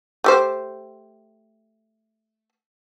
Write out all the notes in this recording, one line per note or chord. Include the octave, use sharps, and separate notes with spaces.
A3 G4 C5